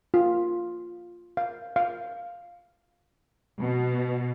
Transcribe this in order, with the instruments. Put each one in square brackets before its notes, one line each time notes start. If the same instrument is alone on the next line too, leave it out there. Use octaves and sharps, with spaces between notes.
[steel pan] F4
F5
F5
[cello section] B2